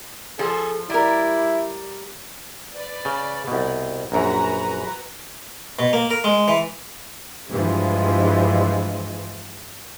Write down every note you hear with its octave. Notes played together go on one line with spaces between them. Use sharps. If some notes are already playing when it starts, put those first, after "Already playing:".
F3 G#4 A4
G3 E4 A#4
B4 D5
C#3
C2 B2
A#1 F#2 F#4 B4 A#5
B2
A#3
A#4
G#3
E3
G2 E3 F3 G#3